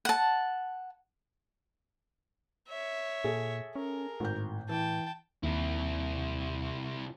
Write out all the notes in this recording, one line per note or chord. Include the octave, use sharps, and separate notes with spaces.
F#5 A5
C#5 E5
A#2 G#4 A4
C#4 A#4
G#1 A2 G6
E3 G5 A5
D#2 C3 E4